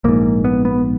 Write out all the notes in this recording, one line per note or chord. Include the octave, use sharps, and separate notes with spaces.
A#1 G#2 A#3
B3
B3